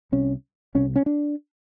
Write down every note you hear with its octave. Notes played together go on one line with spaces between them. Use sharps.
C2 C3 C#4
C2 C3 C#4
C#4
D4